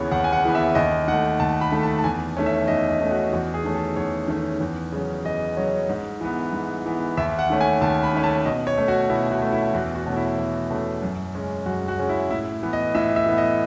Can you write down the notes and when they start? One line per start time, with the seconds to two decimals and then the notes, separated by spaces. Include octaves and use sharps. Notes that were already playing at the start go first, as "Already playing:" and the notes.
Already playing: D#2 C#3 E3 B3 C#5
0.11 D#2 F#5
0.24 G#5
0.33 F#5
0.44 C#3 E3 B3
0.55 E5
0.75 D#2 D#5
1.08 D#3 A3 F#5
1.40 D#2 A5
1.61 B5
1.72 D#3 A3
1.83 A5
1.99 A5
2.04 E2 G#5
2.37 D#3 A3 C#4
2.46 E5
2.68 E2 D#5
2.90 D#5
3.00 D#3 A3 C#4
3.11 F#4
3.33 E2 F#4
3.54 G#4
3.64 D#3 A3 C#4
3.74 A4
3.96 E2 C#5
4.28 D#3 A3 C#4
4.60 E2
4.92 C#3 F#3 C#4
5.25 E2 D#5
5.57 C#3 F#3 C#4
5.89 G#2
6.21 E3 B3
6.53 G#2
6.86 E3 B3
7.17 D#2 E5
7.39 F#5
7.50 D#3 A3 C#4
7.61 G#5
7.81 D#2 A5
8.03 B5
8.13 D#3 A3 C#4
8.24 A5
8.45 B2 D#5
8.67 C#5
8.78 A3 C#4
8.88 F#4
9.10 B2 E4
9.31 F#4
9.42 A3 C#4
9.52 E4
9.74 E2 F#4
9.95 F#4
10.06 B2 A3 C#4
10.17 E4
10.38 E2
10.70 B2 A3 C#4
11.02 F#2
11.35 C#3 G#3 C#4
11.66 F#2 F#4
11.88 F#4
11.98 C#3 G#3 C#4
12.09 E4
12.31 A2 E4
12.63 E3 B3
12.73 D#5
12.95 A2 E5
13.16 E5
13.26 E3 B3
13.38 D#5